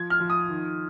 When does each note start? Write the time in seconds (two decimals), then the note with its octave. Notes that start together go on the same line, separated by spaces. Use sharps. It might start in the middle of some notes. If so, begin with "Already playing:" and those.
Already playing: F3 G#6
0.10 F6
0.20 F3
0.30 D#6
0.49 D#3